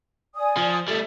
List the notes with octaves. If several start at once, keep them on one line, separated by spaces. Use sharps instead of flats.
D5 G#5 D#6
F3
G3 A3 A4